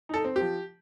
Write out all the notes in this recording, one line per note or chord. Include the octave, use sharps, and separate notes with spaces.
D#4 A4
C4
F3 G4